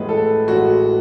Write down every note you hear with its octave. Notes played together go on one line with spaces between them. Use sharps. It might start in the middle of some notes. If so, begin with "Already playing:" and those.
Already playing: A1 A2 G#3 B4
A4
A1 A2 G#3 F#4